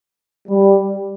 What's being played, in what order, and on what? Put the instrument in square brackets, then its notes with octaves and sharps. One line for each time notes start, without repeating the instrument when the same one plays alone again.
[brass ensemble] G3